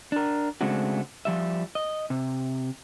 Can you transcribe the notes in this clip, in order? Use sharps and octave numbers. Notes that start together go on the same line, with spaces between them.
D4 A#4
C#3 G#3 A3 C4 D4 F#4
F3 G3 E5
D#5
C3